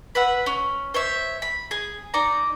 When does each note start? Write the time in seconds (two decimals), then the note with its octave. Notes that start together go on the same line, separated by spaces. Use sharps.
0.15 B4 E5 F#5
0.46 C#4
0.94 C5 C#5 E5
1.42 B5
1.71 G#4
2.14 D#4 D5 A#5